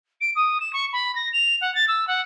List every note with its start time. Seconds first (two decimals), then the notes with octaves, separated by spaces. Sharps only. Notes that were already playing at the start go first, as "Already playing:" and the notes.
0.20 D7
0.35 D#6
0.60 E7
0.73 C#6
0.92 B5
1.15 A#6
1.32 F7
1.61 F#5
1.74 A6
1.88 E6
2.07 F#5